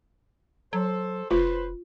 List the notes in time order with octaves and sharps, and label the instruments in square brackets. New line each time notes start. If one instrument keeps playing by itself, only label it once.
[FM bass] F#3 [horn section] A4 C5
[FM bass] F1 [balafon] F4 [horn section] B4 C5